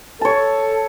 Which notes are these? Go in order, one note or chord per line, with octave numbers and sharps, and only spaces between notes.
A4 C#5 A5